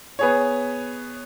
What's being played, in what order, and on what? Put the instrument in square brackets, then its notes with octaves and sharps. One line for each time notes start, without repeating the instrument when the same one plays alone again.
[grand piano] B3 G#4 C#5